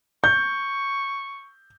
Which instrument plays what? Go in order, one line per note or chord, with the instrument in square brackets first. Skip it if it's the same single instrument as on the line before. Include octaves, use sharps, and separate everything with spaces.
[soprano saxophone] C#6 [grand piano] G6